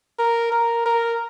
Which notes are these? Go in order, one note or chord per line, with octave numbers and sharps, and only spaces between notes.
A#4
A#4
A#4